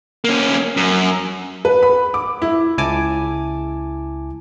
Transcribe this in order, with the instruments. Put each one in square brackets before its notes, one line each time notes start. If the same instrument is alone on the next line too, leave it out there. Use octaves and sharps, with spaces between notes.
[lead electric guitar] A#3 C#4
F#2
[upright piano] B4
B5
D6
E4
[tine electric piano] C#2 E4 G#5 A5 D6